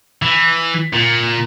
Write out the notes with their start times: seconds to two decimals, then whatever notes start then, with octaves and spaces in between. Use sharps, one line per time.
0.22 E3
0.93 A#2